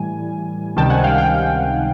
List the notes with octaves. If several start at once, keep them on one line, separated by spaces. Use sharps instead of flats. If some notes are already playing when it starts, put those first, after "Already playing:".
Already playing: A2 E3 G3 G#5
C#2 C3 D#3 G3 G5 A5
F#5 G#5
F5 G5
F5 G5